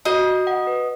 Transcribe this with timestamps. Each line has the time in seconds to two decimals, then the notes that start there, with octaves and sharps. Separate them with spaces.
0.05 F#4 D#5
0.26 F#4
0.47 F#5
0.67 B4